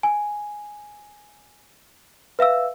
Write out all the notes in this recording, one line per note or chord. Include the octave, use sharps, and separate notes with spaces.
G#5
B4 E5 F5 E6